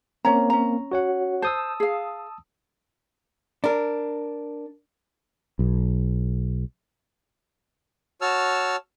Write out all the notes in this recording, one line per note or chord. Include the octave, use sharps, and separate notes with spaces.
A#3 C4 C#4 C#5 A#5
C#4 A#5
F#4 C#5 F#5
C5 A5 D#6 E6
G#4 F5
D4 A#4
B1
F#4 C#5 A5 E6 F6